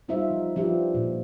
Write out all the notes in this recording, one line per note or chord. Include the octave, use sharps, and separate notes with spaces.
G3 D#4 F4 C5 E5
F3
F3 D4 F4 G4 B4 E5
A#2